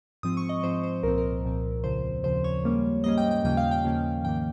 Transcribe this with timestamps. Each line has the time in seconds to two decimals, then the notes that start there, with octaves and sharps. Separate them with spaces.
0.23 G#2 F3 C4 D#6
0.37 C#6
0.49 D#5
0.63 G#2 F3 C4 C5
0.83 C5
1.03 C2 A#2 F3 C4 A#4
1.18 A#4
1.43 C2 A#2 F3 C4
1.84 D#2 C#3 F3 C5
2.24 D#2 C#3 F3 C5
2.44 C#5
2.63 G#2 G3 A#3 C#4
3.04 G#2 G3 A#3 C#4 D#5
3.18 G5
3.31 G5
3.44 D#2 C#3 F3 A#3 C#4 G5
3.57 F5
3.71 G5
3.84 D#2 C#3 F3 A#3 C#4
4.24 G#2 D#3 A#3 G5